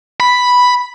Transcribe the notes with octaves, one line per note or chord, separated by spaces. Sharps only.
B5